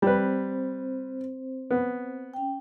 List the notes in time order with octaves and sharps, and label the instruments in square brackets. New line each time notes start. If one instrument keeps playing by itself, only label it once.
[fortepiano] G3 B4 [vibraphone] C4 C5
[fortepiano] B3
[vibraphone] C#4 G5